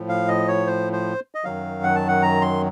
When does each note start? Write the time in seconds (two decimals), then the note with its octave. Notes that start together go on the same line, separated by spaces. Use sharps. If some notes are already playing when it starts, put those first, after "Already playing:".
Already playing: A2 F3
0.09 F5
0.28 D#5
0.48 C#5
0.67 C5
0.93 C5
1.35 D#5
1.45 F#2 D#3 F#3 F5
1.83 F#5
1.95 A5
2.08 F#5
2.22 A#5
2.41 C6